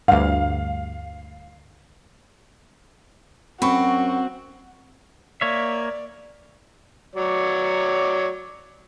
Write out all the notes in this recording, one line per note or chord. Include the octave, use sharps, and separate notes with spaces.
D2 G2 F5
F#2 C4 F#4 B5 C#6
A#3 C#5 D5 E5
F#3 C#5 D5